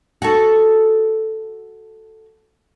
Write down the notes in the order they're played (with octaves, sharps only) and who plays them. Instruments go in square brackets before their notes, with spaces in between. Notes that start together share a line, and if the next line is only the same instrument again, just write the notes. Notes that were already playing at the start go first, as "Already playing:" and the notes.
[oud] F#4 A4